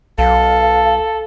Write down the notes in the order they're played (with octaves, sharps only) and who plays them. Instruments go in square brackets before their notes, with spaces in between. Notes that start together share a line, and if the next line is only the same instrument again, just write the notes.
[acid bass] B1 [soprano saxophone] A4 [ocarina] F5